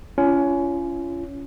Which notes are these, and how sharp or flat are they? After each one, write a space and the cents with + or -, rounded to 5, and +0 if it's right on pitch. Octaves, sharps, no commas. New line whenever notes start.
C#4 +15 F4 -35